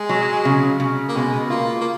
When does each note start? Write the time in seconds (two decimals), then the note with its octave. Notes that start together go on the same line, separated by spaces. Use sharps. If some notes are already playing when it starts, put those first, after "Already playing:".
Already playing: G#3
0.09 F#3
0.45 C#3
0.80 C#3
1.09 A#3
1.16 B2 G#3
1.50 A#3 F4
1.81 A#3